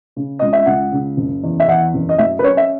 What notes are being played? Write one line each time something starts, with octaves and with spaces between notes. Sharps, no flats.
C#3
C#2 D#5
E5
C#2 F#5
C#3
F#1
E2
E5
E2 F#5
F#1
D#5
F#3 E5
B4
C#4 C#5
E5